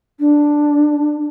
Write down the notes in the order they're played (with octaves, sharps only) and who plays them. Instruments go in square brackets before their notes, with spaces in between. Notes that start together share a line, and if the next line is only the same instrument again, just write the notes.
[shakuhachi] D4